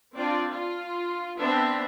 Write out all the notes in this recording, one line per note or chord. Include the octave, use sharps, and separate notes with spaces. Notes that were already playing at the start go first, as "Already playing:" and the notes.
C4 D4 F4 D5
F4
B3 C4 D4 C5 E5